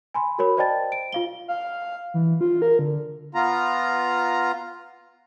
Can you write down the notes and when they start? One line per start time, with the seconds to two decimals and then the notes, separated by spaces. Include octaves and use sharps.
0.14 G#5 B5 C6
0.39 F#4 A#4 C#5 B5
0.57 C5 D5 D#5 G5 A5 A6
0.92 D7
1.12 F4 F5 G7
1.48 F5
2.14 E3
2.41 F4
2.62 A#4
2.79 D3
3.35 B3 F4 A#5